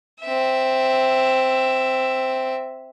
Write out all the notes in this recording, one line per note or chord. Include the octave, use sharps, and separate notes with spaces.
C4 E5